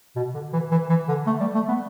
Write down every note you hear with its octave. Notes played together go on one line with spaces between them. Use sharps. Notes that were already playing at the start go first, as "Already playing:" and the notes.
B2
D3
E3
E3
E3
D3
A3
G3
A3
B3